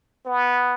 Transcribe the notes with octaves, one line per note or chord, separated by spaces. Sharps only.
B3